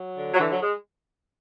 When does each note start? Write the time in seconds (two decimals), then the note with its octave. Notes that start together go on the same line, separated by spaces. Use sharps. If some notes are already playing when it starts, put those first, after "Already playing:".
Already playing: F#3
0.17 D3
0.34 F#3
0.40 D3 E3
0.51 F#3
0.62 G#3